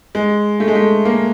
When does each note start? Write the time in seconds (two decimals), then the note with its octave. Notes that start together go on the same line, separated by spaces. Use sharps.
0.15 G#3
0.60 A3
0.68 G#3
0.75 A3
1.05 A#3